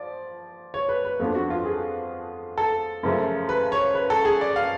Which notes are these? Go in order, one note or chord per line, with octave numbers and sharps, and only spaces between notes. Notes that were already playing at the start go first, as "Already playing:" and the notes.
Already playing: F3 D5
C#5
B4
B4
F2 F3 B3 D4
F#4
F4
G#4
A4
F#2 C#3 F3 A3
B4
C#5
B4
A4
G#4
D5
F5